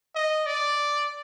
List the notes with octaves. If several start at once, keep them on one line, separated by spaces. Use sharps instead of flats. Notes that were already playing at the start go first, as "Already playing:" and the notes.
D#5
D5